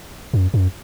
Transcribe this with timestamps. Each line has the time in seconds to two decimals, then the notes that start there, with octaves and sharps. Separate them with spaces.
0.34 F#2
0.54 F#2